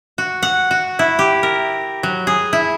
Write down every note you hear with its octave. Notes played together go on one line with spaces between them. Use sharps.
F#4
F#5
F#4
E4
G4
A#4
F#3
G#4
E4